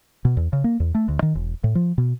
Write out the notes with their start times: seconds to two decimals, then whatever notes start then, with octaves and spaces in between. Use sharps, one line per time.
0.25 B2
0.37 E2
0.53 C#3
0.64 A#3
0.80 E2
0.95 A3
1.08 D2
1.22 D#3
1.35 E1
1.64 A2
1.75 F3
1.98 B2